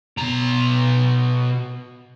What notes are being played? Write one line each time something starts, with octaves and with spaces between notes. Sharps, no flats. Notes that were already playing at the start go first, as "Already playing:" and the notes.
B2 A#5